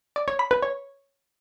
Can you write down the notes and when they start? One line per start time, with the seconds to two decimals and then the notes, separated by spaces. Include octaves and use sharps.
0.16 D5
0.28 C#5
0.39 B5
0.51 B4
0.62 C#5